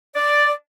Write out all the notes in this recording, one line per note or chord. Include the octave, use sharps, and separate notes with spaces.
D5